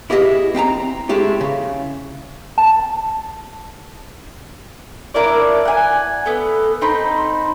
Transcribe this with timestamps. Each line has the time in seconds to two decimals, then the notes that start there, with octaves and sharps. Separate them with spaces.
0.10 E4 G4 G#4 D#5 E5
0.55 C4 G5 A5 A#5
1.09 G#3 A3 E4 G4 G#4
1.41 C#3
2.58 A5
5.14 D4 E4 A#4 D5
5.65 F#5 G#5
6.26 A3 B3
6.81 C4 D#4 B5 C6